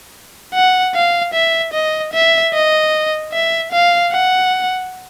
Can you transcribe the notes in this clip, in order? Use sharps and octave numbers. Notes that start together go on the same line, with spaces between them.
F#5
F5
E5
D#5
E5
D#5
E5
F5
F#5